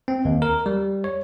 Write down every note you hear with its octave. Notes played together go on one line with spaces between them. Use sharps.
C4
D#2
A#4
G3
C#5